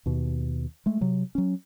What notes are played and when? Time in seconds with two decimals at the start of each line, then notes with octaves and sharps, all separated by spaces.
0.06 D#2 B2
0.86 G#3 A3
1.01 C3 F#3
1.35 F#3 C#4